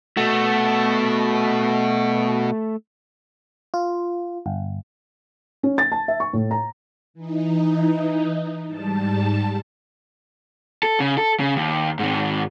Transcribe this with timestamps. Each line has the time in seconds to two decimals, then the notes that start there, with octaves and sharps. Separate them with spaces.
0.17 B2 A3 F#4
3.74 F4
4.46 G1
5.63 C#4
5.78 A6
5.92 A5
6.08 E5
6.20 C#6
6.33 A2
6.51 A#5
7.14 E3 D#4
8.67 G#2 G3 A5
10.83 A4
11.00 C#3
11.18 A4
11.40 C#3
11.56 D#2
11.99 G#2 D#3